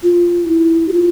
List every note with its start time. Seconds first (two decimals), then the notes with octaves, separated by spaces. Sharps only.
0.03 F4
0.48 E4
0.88 G4
0.93 F4